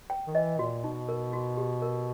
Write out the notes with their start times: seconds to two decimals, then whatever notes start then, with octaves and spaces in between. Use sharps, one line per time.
0.10 G5
0.27 D#3
0.35 E3 D#5
0.59 A#2 F#4
0.84 B2 D#4
1.09 A#4
1.33 F#4
1.57 G4
1.82 A#4